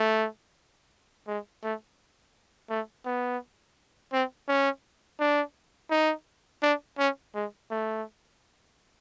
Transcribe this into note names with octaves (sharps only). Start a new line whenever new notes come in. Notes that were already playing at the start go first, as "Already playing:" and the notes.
Already playing: A3
G#3
A3
A3
B3
C4
C#4
D4
D#4
D4
C#4
G#3
A3